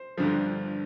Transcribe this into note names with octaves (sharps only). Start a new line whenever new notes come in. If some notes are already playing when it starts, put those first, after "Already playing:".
Already playing: C5
G1 G2 D3 F3